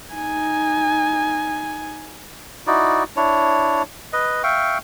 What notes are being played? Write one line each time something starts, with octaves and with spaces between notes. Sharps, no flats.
D#4 G#5
D#4 E4 F#4 D5
D4 E4 C#5
B4 D#5
E5 F5 G5 C#6